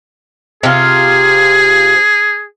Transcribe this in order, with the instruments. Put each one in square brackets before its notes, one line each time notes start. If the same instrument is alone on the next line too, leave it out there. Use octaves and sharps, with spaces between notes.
[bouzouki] C3 F4 [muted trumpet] G#4